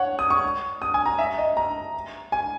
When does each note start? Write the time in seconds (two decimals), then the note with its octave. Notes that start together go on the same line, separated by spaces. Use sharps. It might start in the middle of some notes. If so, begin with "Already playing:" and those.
Already playing: C#5 F#5
0.19 D#6
0.30 C#6
0.82 D#6
0.94 G#5
1.06 A#5
1.19 E5
1.38 D#5
1.57 A#5
2.32 G#5